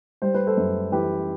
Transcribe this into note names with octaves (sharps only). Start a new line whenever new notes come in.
G3 C5
B4
A4 C5
F#2
E3 G4 B4